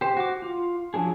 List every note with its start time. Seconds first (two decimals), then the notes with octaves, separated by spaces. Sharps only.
0.01 G4 C5
0.17 F#4 D6
0.42 F4
0.94 F3 F#3 D4 G#4